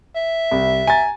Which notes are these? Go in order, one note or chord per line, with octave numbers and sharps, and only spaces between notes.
E5
C2
G#5 A#5 A6